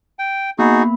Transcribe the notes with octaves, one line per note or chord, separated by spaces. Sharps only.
G5
A#3 B3 D#4 F#4 G#4 B5